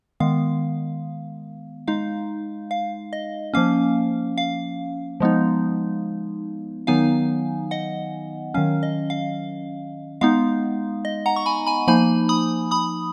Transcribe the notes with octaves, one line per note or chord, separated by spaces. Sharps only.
D#3 G#3 B3 F5
G#3 D#4 F5
F5
D#5
F3 A#3 C#4 F5
F5
F3 G#3 B3 D#4
D#3 F#3 B3 D#4 F5 G#5
D#5 F#5
D#3 F#3 C#4 F5
D#5
F5
G#3 B3 D#4 F5
D#5
F#5 A#5
C#6
G#5 B5
G#5 B5
F3 A#3 D#4 G#5 B5
B5 D#6
B5 D#6